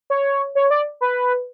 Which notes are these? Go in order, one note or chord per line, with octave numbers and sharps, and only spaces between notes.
C#5
C#5
D5
B4